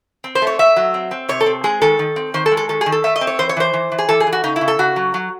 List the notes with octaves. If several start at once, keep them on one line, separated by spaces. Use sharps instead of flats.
C4
C5
A3
C#5
A3 E5
F#3
C4
C4
C3 C#5
A4
C4
G#3 G#4
D#3 A4
D#3
C4
D#3 C5
A4
G#3
A4
D#3 A4
G#4
D#3
A4
A3 E5
D#5
C4
C#5
E3 C5
C#5
E3 C5
E3
E3
G#4
E3 A4
G#4
E3
F#4
C#3 D#4
E4
C#3
A4
C#3 F#4
F#3
F#3